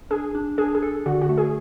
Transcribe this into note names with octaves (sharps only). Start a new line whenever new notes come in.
D4 G#4
D4
D4 G#4
G#4
A4
D3 F#4
F#4
A3
G#4